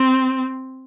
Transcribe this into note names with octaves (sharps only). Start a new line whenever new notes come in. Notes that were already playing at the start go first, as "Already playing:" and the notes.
Already playing: C4